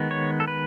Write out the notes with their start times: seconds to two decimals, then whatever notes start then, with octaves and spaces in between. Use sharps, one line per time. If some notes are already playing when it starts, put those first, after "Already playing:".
Already playing: D#3 G#3 B3
0.11 C#5
0.40 A4
0.48 B4